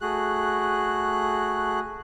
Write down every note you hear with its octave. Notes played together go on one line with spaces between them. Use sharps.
A3 F#4 G#4 F#6